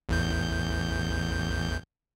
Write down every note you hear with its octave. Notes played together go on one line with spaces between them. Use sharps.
A1 E2 G6